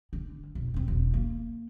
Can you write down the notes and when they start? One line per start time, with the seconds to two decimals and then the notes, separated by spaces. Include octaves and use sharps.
0.13 D3
0.55 E1
0.74 D#1 C4
0.88 E1
1.14 A#3